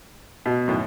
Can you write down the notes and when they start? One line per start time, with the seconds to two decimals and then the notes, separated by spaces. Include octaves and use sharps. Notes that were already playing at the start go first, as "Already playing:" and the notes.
0.46 B2
0.68 F#2 A2 D#3